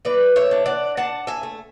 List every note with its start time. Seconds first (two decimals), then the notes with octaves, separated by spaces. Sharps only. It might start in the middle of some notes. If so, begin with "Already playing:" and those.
0.05 E3 B4 D5
0.36 C#5 E5
0.51 D4
0.66 D5 F#5
0.97 D4 F#5 A5
1.27 E5 G#5
1.43 A3